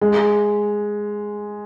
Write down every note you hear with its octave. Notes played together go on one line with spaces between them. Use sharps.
G#3